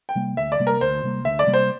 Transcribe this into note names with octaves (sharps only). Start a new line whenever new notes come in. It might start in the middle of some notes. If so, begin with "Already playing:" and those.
G5
C3 G3 A#3
D2 E5
D5
C3 G3 A#3
A#4
D2 C5
C3 G3 A#3
D2 E5
D5
C3 G3 A#3
C5